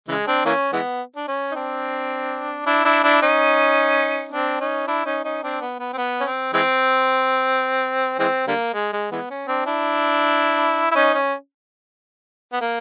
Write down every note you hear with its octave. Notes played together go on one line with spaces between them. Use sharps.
C#3 E3 G#3
C4 D4
E3 A#3 C#4
E3 G#3 B3
D4
C#4
D#4
C4 D4
D4 E4
D4 E4
D4 E4
C#4 D#4
C4 D4
C#4 D#4
D4 E4
C#4 D#4
C#4 D#4
C4 D4
B3
B3
C4
B3
C#4
C4
E3 G#3 C4
E3 G#3 C4
D3 G3 A#3
G#3
G#3
E3 G#3 B3
C#4
C4 D4
D4 E4
E4
C#4 D#4
C#4
B3
A#3